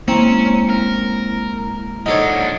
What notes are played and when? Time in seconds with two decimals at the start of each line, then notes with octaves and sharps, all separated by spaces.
0.08 G#3 A#3 C4 C#4 E4 A#5
0.69 A#4
2.06 F3 D4 D#4 A4 C#5 F#5